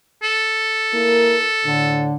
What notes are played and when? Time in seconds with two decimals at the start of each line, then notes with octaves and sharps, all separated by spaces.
0.23 A4
0.93 A#3 E4 A#4
1.65 A2 D3